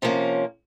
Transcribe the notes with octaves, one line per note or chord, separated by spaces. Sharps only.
C3 F3 A#3 C#4